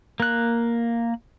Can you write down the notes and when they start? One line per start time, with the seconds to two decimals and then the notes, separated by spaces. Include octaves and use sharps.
0.20 A#3 F#6